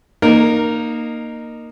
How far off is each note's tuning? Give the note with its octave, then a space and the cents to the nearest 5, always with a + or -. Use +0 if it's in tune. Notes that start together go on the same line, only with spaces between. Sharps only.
A#3 +0 D#4 -20 A#4 +0